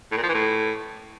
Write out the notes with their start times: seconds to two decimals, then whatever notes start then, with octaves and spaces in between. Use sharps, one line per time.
0.12 A2
0.17 A#2
0.23 F3
0.29 E3
0.34 A2